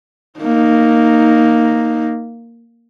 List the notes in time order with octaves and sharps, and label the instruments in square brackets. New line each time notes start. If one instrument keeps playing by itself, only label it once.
[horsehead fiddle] A#3 D#4